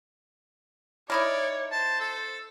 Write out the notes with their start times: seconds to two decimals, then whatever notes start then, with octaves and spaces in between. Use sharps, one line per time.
1.10 D#4 E4 A#4 C#5 D5
1.72 C5 A5
2.00 A4